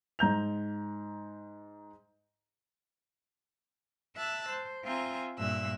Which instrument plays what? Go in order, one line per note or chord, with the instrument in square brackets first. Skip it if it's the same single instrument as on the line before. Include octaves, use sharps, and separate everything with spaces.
[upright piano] G#2 A#5 G6 F7
[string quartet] E5 A5 E6 F#6
C5
C4 F4 E5 G#5 A#5
G2 A#2 E5 E6 F#6